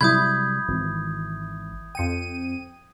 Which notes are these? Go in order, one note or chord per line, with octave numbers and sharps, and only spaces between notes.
C3 F#3 G3 E4 B5 D#6 G6 G#6
G#1 E3
F2 G5 C#7 D#7